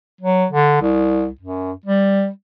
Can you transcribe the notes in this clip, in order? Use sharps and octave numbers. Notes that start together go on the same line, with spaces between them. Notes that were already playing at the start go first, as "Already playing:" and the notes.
F#3
D3
C2
F#2
G3